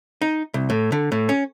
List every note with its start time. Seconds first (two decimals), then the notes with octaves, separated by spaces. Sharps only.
0.22 D#4
0.54 C2
0.70 A2
0.92 D3
1.12 A2
1.29 C#4